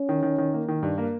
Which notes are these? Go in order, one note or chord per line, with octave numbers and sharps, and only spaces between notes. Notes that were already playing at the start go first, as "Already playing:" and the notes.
Already playing: C#4
D#3
D#3
D#3
A#3
D#3
G2
A#3